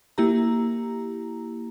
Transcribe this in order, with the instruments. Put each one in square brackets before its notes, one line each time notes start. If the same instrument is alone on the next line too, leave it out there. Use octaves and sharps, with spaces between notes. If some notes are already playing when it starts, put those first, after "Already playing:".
[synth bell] A#3 E4 G4 A#5